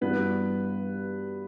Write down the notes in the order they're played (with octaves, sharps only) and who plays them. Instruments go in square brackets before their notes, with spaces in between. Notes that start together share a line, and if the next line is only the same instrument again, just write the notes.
[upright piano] G2 E3 G3 D4 F#4 [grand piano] B3 B4